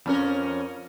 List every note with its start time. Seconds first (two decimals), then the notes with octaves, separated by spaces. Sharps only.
0.06 F2 C#4 A#4